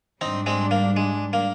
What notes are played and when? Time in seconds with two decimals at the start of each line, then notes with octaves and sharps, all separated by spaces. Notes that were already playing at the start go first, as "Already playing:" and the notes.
0.21 G#2 G3 C4 D4 D#4
0.46 G#3 C4
0.71 A#3
0.97 G#3
1.33 A#3